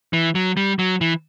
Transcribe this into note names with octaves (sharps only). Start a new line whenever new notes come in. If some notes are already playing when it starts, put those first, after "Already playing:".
E3
F#3
G3
F#3
E3